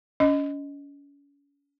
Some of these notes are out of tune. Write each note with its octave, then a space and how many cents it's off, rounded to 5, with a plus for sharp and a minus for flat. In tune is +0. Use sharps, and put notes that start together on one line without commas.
C#4 +35 D#5 +0